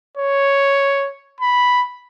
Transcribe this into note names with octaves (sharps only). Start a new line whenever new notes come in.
C#5
B5